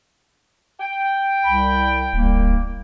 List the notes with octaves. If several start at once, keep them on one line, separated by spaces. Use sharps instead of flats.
G5
C2 B5
D1 C2 A#3